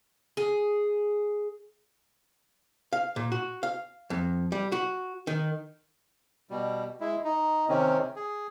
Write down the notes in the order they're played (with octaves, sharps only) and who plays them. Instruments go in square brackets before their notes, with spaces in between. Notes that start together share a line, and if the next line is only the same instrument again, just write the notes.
[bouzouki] G#4
[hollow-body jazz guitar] F5
A#2
F#4
F5
F2
G3
F#4
D#3
[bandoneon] B2 G3
G#3 E4
D#4
C3 D#3 C4 C#4
G#4